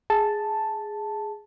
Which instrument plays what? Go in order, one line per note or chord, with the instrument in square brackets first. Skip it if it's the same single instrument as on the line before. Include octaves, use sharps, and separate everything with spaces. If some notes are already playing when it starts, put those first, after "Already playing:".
[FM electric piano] G#4 A5